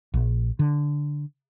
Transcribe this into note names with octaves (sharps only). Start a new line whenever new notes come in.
A#1
D3